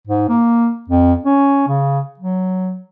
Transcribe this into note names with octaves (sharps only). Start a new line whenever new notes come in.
G#2
A#3
F2
C#4
C#3
F#3